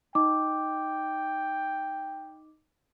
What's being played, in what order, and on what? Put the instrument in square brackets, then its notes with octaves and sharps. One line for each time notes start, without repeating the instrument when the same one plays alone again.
[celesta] D#4 D#5 D6 [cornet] G5